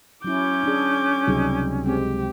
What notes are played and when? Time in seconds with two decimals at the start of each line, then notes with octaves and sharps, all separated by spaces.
0.24 F#3 C#4 E4 D6 G6
0.64 D4 G#4
1.27 C#2 C3 F#3 G3 D#4 G#4
1.86 G#3 C4 G4